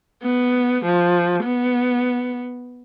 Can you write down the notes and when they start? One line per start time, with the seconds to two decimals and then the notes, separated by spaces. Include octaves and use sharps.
0.22 B3
0.85 F3
1.43 B3